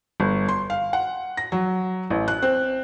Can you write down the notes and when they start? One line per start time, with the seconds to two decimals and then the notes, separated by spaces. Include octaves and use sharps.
0.20 G1
0.48 C6
0.70 F5
0.93 F#5
1.37 A#6
1.52 F#3
2.10 A1
2.28 F#6
2.42 C4